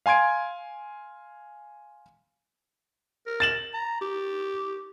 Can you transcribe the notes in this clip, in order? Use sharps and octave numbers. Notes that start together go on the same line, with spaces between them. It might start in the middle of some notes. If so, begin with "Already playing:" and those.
F5 G#5 C6 G#6 D7
A#4
A6 E7 F#7
A#5
G4